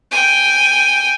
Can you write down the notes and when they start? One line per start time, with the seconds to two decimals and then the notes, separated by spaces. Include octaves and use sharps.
0.12 G5 G#5